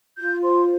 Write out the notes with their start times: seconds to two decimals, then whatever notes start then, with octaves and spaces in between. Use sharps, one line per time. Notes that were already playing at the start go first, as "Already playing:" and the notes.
0.18 F4 G6
0.43 C5 C6